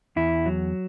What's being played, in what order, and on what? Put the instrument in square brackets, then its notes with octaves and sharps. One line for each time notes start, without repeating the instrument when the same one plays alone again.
[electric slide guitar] E2 E4
F#3